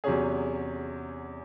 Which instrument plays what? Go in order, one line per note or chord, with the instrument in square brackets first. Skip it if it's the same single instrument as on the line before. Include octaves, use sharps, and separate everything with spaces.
[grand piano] E2 C3 F#3 C#4 G#4